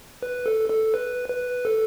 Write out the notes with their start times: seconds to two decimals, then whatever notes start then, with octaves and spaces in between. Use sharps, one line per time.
0.23 B4
0.46 A4
0.70 A4
0.94 B4
1.29 B4
1.65 A4